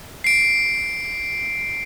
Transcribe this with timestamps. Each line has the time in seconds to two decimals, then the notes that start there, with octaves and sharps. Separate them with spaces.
0.24 C7 D7